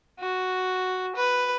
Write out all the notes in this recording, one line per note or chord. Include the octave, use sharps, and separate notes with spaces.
F#4
B4